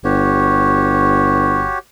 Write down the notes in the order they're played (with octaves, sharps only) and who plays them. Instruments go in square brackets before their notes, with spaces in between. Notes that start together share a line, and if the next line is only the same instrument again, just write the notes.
[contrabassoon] G1 [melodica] F#4 G4 C#5